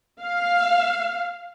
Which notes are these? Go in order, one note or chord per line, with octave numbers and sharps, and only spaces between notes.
F5